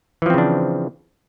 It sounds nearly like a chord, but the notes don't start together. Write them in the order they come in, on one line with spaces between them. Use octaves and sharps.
E3 F3 C4 C#3 D4